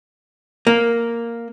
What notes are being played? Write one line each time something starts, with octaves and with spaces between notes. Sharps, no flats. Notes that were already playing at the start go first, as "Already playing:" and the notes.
A#3